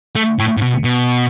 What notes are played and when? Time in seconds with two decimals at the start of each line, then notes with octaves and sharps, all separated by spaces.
0.15 A3
0.39 A2
0.57 A2
0.62 B2
0.84 B2